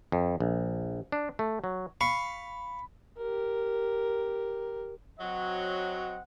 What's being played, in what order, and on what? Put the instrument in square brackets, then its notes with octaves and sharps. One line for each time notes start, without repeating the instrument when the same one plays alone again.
[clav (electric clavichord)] F2
A#1
D4
A3
F#3
[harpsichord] F5 C#6 [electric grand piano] B5
[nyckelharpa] G4 A#4
[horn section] F#3 [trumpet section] C4 D#5 F#5